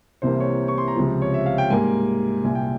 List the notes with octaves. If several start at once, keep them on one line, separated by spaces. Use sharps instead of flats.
C2 C3 E3 A#3 C5
C#5
C#6
C6
A#5
C#2 C3 F3
C#5
E5
F5
G5
G#2 G3 A#3 G#5
C2 A#2 G3 G#5
G5